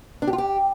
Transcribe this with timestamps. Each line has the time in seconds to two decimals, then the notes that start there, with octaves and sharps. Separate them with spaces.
0.22 D4
0.27 G4
0.33 F4
0.38 G4